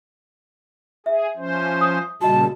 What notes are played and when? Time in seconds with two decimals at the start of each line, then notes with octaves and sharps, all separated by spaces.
1.06 G#4 E5
1.37 F3 C#4 C5
1.81 D#6
2.21 A#2 C#3 G3 F#4 D#5 A5